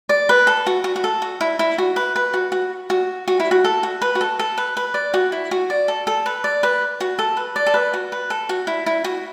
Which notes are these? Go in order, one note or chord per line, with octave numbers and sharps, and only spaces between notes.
D5
B4
A4
F#4
F#4
F#4
A4
F#4
E4
E4
F#4
B4
B4
F#4
F#4
F#4
F#4
E4
F#4
A4
F#4
B4
F#4
A4
A4
B4
B4
D5
F#4
E4
F#4
D5
A4
A4
B4
D5
B4
F#4
A4
B4
D5
A4
B4
F#4
B4
A4
F#4
E4
E4
F#4